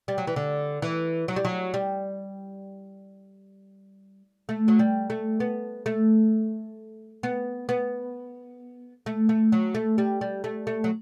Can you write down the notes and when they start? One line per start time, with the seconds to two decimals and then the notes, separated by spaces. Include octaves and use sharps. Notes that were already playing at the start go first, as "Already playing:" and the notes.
0.08 G3
0.18 F#3
0.27 E3
0.36 D3
0.82 E3
1.28 F#3
1.36 G3
1.45 F#3
1.74 G3
4.49 A3
4.68 F#3
4.79 G3
5.10 A3
5.40 B3
5.86 A3
7.23 B3
7.69 B3
9.06 A3
9.29 A3
9.52 F#3
9.75 A3
9.98 G3
10.21 G3
10.44 A3
10.67 A3
10.84 F#3